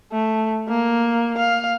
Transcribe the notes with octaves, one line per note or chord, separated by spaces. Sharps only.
A3
A#3
F5